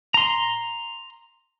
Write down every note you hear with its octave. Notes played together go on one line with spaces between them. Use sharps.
A#5 C6